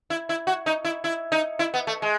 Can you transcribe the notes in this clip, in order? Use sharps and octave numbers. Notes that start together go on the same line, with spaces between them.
E4
E4
F#4
D#4
E4
E4
D#4
E4
B3
A3
G#3